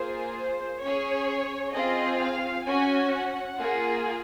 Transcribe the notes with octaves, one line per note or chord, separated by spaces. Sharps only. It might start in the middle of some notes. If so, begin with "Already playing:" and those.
Already playing: A#3 F4 G#4 C5
C5
C#4 G#4 C#5
C4 F4 G#4 D#5
F5
C#4 F#4 G#5
F#5
A#3 F4 G#4